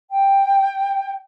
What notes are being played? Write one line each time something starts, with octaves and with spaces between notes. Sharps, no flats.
G5